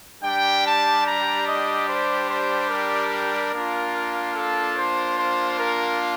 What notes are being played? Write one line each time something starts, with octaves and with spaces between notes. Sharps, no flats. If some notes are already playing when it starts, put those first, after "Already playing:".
G3 D4 G4 G5
A5
A#5
D#5
C5
C5
A#4
A#3 D4 F4
A4
C5
C5
A#4